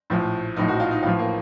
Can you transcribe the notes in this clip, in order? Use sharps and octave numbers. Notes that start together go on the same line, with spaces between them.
A#1 A2 F3
A#1 A2 F3 D#4
F#4
F4
D#4
A1 A2 F3 F4
A#3